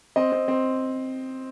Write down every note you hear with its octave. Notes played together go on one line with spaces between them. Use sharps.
C4 D#5
C4
C4